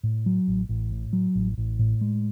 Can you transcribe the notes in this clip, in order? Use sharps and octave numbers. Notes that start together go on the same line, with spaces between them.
A2
F#3
A1
A1
A2
F#3
A1
A1
A2
G#3